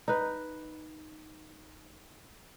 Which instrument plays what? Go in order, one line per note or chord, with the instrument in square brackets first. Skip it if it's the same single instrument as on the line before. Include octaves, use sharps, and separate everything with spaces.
[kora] D#4 B4